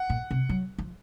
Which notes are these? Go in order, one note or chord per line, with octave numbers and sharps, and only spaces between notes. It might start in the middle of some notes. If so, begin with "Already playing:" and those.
Already playing: F#5
A#2
C3
F#3
F3